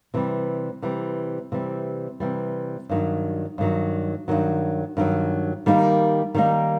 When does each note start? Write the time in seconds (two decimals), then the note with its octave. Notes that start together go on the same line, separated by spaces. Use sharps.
0.14 C3 E3 G3
0.82 C3 E3 G3
1.52 C3 E3 G3
2.20 C3 E3 G3
2.89 G2 D#3 F#3
3.58 G2 D#3 F#3
4.28 G2 D#3 F#3
4.97 G2 D#3 F#3
5.66 D#3 G3 A#3 D#4
6.34 D#3 G3 A#3 D#4